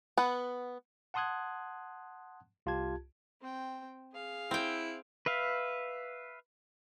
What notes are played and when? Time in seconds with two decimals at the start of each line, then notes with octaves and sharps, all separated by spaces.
0.17 B3 B4 F#5
1.14 F#5 A5 C6 D#6 F#6 G#6
2.66 C2 F4 G4 A5 G#6
3.41 C4 G5
4.13 G#4 F5
4.51 C4 E4 G5
5.26 B4 E5 F5